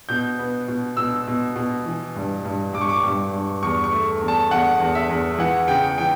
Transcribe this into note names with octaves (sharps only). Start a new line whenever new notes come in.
B2 G6
B3
B2
B2 E6
B2
B2
E3
G2
G2
G2 D6
C#6
D6
G2
G2
E2 C#6
C#6
A3
E2
A5
E2 F#5
E2
E5
E2
E3 F#5
C#3 G5
E3 G5